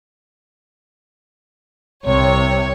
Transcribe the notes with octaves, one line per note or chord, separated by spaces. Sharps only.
C2 C3 C#5